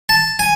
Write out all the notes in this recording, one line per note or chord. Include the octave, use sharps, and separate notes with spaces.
A5
G#5